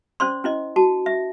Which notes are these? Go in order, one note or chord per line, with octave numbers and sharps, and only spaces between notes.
C#4 C5 D5 C6
C#4 E4 D#5
F#4 A5
E5